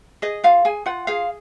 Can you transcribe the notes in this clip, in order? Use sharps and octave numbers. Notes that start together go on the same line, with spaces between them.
G#4 D#5
F4 F5
G#4 G#5
F4 F#5
G#4 F5